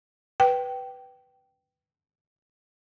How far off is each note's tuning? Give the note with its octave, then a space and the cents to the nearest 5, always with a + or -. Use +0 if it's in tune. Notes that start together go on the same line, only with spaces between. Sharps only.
B4 +0 G5 -15